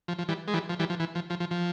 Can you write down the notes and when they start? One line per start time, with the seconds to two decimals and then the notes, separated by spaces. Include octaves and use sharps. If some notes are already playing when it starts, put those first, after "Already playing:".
0.08 F3
0.18 F3
0.28 E3 G3
0.48 G#3
0.54 E3 G3
0.69 F3
0.79 E3 G3
0.90 F3
1.00 E3
1.15 F3
1.30 F3
1.40 F3
1.51 F3